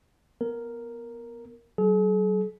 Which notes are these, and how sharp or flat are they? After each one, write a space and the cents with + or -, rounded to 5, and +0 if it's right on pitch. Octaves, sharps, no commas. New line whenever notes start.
B3 -15 A#4 +0
F#3 +40 G#4 +45